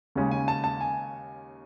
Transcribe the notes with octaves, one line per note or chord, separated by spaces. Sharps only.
D#2 C#3 G#3 C#4
G#5
A5
A5
G#5